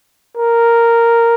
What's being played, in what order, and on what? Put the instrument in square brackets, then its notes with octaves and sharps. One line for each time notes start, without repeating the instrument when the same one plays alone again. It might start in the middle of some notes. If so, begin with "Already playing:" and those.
[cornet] A#4